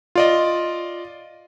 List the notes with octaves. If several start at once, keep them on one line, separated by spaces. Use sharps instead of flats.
F4 D5 D#5